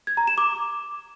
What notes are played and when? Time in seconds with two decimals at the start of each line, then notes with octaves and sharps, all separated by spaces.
0.07 G#6
0.17 A#5
0.27 E7
0.38 D6